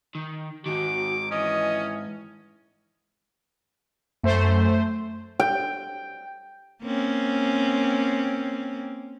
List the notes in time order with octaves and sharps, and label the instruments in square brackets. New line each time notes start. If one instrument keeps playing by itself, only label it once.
[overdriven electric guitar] D#3
[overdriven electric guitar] G#2 D#3 [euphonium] F#4 [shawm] D6
[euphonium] E3 [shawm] C#4 [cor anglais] D#5
[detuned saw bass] F#2 [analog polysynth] A3 C5
[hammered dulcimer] G5
[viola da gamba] A#3 C4 C#4